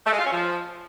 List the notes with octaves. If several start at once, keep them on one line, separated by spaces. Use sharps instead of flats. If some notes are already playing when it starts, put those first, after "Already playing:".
A3
G#3
F4
C#4
F3